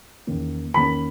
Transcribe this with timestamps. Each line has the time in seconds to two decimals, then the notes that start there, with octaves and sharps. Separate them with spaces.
0.27 E2 D#3 A#3 C#4
0.74 E2 D#3 A#3 C#4 B5